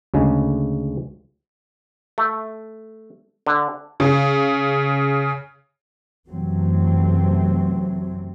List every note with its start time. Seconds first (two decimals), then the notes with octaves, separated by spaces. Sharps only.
0.14 D2 C#3 G#3
2.18 A3
3.47 D3
4.00 C#3
6.29 F#2 C3 E3 F#3 A3 C4